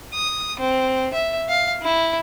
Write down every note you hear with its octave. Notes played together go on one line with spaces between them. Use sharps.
D#6
C4
E5
F5
E4